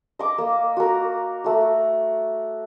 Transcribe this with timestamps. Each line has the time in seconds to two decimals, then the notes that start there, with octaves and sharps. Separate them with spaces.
0.19 D#5 D6
0.38 A#3
0.77 F#4 A#4
1.44 A3 F#4